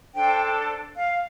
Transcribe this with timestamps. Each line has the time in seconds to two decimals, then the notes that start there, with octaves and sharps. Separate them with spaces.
0.15 D4 A4 C5 G5
0.97 F5